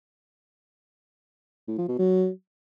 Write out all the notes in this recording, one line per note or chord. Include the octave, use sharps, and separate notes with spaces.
A2
F3
B2
F#3